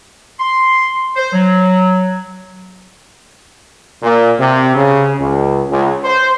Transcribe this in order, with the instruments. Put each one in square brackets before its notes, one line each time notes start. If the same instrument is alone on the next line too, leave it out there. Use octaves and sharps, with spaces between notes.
[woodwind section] C6
C5
F#3
[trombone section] A#2
C3
C#3
C#2
C#2
C5